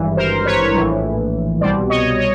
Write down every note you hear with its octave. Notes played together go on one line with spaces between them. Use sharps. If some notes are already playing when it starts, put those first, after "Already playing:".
Already playing: G#1 G2 E3
A#4 C5
B4 C#5
A#1 A2 E3
C2 B2 G3 C5 D5
C#5 D#5
C#5 D#5